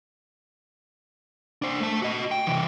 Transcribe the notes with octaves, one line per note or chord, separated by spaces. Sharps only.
D4 C5
A3 A5
F#4 D#5
G5
C3 E3